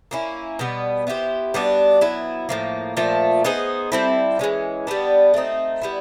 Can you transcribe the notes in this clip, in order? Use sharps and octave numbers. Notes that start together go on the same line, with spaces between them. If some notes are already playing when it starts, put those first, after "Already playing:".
A#3 C#4 E4
B2 G3 B3
B3 E4 G4 C5
G3 B3 D4 F#4
F#3 B3 E4
A2 F3 A#3
A#2 F3 A3
B3 D#4 G#4 C5
G3 C4 E4 A4
E3 G#3 C#4
G3 B3 D4
A3 C4 D#4
G3 B3 E4